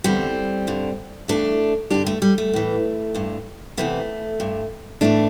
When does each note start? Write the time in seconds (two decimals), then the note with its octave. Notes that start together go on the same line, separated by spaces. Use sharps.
0.04 E2 D3 G3 C4
0.67 G2 D3
1.28 G2 E3 A3 D4
1.90 G2 D3 D4 G4
2.06 A3
2.22 G3
2.38 A3
2.53 A2 E3
3.15 G2 D3
3.77 E2 C3 E3 A3
4.40 G2 D3
5.01 A2 E3 A3 D4